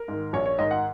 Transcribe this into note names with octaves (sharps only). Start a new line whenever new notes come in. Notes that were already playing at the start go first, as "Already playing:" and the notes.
Already playing: A#4
G#2 D#3
A#1 C#5
C#5
G#2 D#3 D#5
F#5